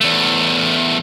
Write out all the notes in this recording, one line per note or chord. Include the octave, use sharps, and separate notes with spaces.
E2 A3